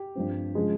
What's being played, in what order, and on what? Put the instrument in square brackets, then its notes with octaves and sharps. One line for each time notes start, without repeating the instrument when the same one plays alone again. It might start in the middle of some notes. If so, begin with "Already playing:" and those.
Already playing: [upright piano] G4
G2 F3 C4
C#3 F3 G#3 G#4